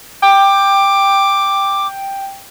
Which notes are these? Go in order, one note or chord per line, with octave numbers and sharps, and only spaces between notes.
G5 D6